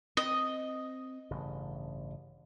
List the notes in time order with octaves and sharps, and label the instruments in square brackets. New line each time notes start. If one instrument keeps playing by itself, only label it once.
[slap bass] C4 [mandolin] D#5
[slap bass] A1 G2 C#3